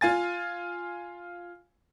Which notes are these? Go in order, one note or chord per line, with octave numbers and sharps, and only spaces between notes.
F4 F5 G#5 A6